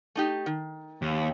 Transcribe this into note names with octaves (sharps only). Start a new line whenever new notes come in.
A3 D#4 G4
D#3
D#2